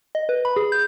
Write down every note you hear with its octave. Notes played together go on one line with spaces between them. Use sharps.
D#5
B4
B5
G#4
G6